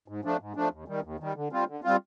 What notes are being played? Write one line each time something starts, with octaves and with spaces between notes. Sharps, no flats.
G#2
F3 A3 D4
G#2
F3 A3 D4
D#2
D#3 G3
D#2
D#3 G3
D3
G3 C4 F4
D3
G3 C4 F4